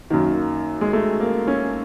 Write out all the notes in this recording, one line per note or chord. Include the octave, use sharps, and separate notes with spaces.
F#2 D#3 A#3
G#3
A3
A#3
C#4